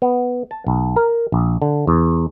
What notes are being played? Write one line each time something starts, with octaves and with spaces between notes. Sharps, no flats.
B3
A5
B1
A#4
A#1
D3
E2